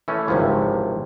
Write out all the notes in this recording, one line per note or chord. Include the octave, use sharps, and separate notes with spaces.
E3 A3 C#4
G#1 C#2 C3 E3 F3